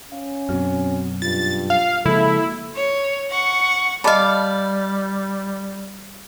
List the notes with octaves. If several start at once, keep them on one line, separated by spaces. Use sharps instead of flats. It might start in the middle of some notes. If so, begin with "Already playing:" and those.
C#4 F5
F#2 B2 C4 F#4 F6
G2 F4 A6
F5
C#3 F3 G#3 A#3 E4 F#4 A4
C#5
F#5 C#6
G3 D5 D#5 F5 A5 B5